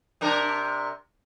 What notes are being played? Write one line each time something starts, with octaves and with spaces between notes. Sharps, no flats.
C3 D4 A#4